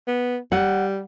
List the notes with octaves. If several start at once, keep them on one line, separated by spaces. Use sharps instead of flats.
B3
G3 F#5